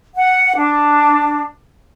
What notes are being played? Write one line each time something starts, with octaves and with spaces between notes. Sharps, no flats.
F#5
D4